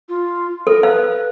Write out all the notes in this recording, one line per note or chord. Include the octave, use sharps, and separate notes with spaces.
F4
A4 A#4
B4 F5